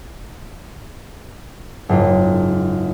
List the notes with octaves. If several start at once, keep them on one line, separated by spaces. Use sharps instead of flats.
F#1 G#2 F4